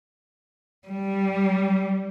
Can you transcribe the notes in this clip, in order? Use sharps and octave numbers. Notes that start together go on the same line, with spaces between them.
G3